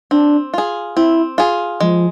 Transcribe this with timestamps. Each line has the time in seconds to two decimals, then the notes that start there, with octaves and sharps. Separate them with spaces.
0.11 C4 D4
0.54 F4 G#4
0.96 C4 E4
1.38 F4 G#4
1.80 F3 G#3